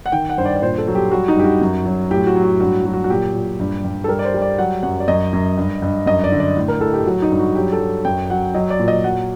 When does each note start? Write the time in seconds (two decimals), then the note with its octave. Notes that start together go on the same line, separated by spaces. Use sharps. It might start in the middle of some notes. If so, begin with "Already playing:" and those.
0.06 F#5
0.12 D#3 G5
0.30 F#5
0.38 G2 C5
0.45 D5
0.56 D5
0.62 A#2 C5
0.78 A4
0.88 F#3
0.95 G4
1.11 G3 F#4
1.28 D#4
1.37 G2 G4
1.44 F#4
1.61 F#2
1.86 F#3
2.10 A2 G4
2.27 F#4
2.36 F#3
2.44 F#4
2.60 G2 F#4
2.86 F#3
2.93 F#4
3.04 F#4
3.10 A#2 G4
3.34 A#2
3.60 G2
3.84 G2
4.04 A4
4.08 G3 A#4
4.19 D5
4.25 C5
4.34 G3
4.42 D5
4.58 F#3 F#5
4.83 F#2 F#5
5.00 D5
5.08 F#2 D#5
5.33 F#2
5.57 G2
5.82 G2
6.06 F#2 D#5
6.24 D5
6.32 D3
6.40 D5
6.57 A2
6.68 A#4
6.81 A2 A4
6.93 G4
7.06 F#3 F#4
7.22 D#4
7.31 G2
7.39 F#4
7.55 F#3 G4
7.72 A4
7.80 F#3
8.05 F#2 G5
8.30 F#3 F#5
8.54 F#3 D#5
8.70 D5
8.79 A#2
8.88 D#5
9.04 F#3 F#5